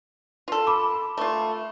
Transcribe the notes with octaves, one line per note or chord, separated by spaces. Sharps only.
F4 A4
B5 D6
A3 F4